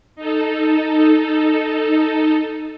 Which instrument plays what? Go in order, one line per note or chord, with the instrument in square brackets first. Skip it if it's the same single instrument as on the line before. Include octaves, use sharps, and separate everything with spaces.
[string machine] D#4 A4